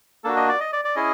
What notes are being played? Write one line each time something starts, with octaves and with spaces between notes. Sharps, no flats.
A#3 D4 F#4 A4
D#5
D5
D#5
D5
D5
C#4 E4 G#4 D#5